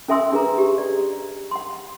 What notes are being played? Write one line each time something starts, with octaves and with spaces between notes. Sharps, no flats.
C#4 A4 E5 G#5 C6 E6
D4 G#4 B4 A#5
G4
D5
F#5 C6